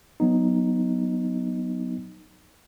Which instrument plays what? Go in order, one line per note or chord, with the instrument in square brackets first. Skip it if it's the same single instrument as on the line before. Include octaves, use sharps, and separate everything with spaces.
[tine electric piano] F#3 B3 D#4